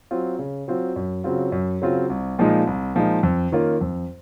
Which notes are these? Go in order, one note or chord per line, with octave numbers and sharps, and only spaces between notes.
F#3 C4 F4
C#3
F#3 C4 F4
F#2
C#3 F#3 C4 F4
F#2
C#3 F#3 C4 F4
C2
A#2 F3 G#3 D#4
C2
A#2 F3 G#3 D#4
F2
D#3 A#3 C#4 F4
F2